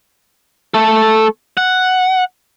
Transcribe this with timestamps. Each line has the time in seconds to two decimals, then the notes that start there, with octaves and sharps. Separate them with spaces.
0.74 A3 A4
1.57 F#5